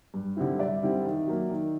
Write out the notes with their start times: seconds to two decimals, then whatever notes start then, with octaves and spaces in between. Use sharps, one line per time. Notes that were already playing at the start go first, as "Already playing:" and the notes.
0.14 G2
0.37 D3 G3 C4 E4
0.59 G2 D5 E5
0.83 D3 G3 C4 E4
1.05 D#3
1.27 F#3 A#3
1.50 D#3